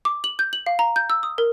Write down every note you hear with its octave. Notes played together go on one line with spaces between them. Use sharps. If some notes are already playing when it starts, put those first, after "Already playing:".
D6
F#7
G6
F#7
F5
A#5
G6
E6
D#6
A#4